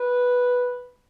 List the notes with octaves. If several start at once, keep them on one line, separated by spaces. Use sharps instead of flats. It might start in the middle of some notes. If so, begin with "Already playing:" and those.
Already playing: B4